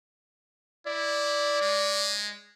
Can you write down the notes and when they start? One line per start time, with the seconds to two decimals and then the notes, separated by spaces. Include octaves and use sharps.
0.87 E4 D5
1.61 G#3